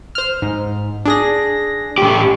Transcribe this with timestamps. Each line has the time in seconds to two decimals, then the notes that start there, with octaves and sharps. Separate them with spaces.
0.15 C5 F6
0.42 G#2
1.05 D4 G#4 A#6
1.98 A2 G4